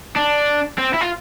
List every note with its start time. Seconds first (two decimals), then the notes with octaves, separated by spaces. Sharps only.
0.16 D4
0.79 C4
0.94 E4
1.01 F4